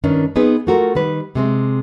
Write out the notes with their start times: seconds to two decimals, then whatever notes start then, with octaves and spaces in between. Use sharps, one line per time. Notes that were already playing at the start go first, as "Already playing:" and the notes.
0.04 G2 D#3 C#4 D4
0.36 B3 C4 D#4 G#4 B4
0.67 A3 F4 F#4 A4 A#4
0.95 D#3 G3 B4
1.35 C3 G#3 C4